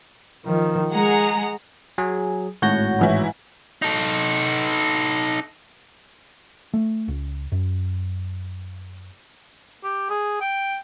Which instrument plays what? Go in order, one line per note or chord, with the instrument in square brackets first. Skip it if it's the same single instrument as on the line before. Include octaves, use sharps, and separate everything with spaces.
[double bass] D#3 F3
[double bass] G#3 [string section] G#4 F#5 A#5
[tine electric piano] F#3 [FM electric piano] G#4
[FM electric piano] G#1 F#4 C#5 [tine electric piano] A2 G6 A#6
[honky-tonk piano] G#2 E3 E4
[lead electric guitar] D#4 A4
[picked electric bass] A3
C#2
F#2
[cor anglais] G4
G#4
G5